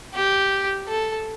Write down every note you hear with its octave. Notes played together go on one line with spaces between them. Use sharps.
G4
A4